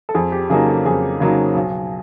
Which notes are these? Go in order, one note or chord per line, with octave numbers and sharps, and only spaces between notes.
A4
F2 G#4
G4
C#3 F#3 A#3 D#4 G#4
A4
F2 G#4
C#3 F#3 A#3 D#4
B1